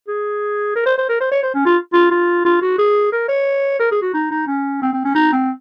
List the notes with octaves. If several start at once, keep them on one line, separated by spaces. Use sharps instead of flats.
G#4
A#4
C5
C5
A#4
C5
C#5
C5
C#4
F4
F4
F4
F4
F#4
G#4
A#4
C#5
A#4
G#4
F#4
D#4
D#4
C#4
C4
C4
C#4
D#4
C4